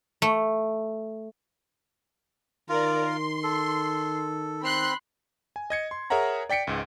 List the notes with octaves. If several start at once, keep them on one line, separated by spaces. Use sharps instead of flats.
A3
D#3 F4 A#4 D5
C6
A4
C4 B5 C6 F#6
G#5
D#5 G#6 C#7
C6
G#4 A#4 C#5 E5 F#5 A#5
D5 G5 B6 C#7 D7
C#2 G#2